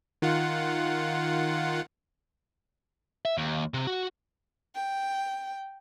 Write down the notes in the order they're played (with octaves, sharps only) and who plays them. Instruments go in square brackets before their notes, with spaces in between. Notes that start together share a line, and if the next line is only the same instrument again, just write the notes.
[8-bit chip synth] D#3 F4 F#5
[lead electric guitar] E5
D#2
C3
F#4
[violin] G5